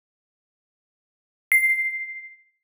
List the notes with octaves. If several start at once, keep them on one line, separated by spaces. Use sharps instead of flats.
C7